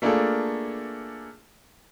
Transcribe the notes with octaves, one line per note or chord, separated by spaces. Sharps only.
A3 A#3 D4 F4 G#4 A4